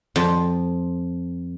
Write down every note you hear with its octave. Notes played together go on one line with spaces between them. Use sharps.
F2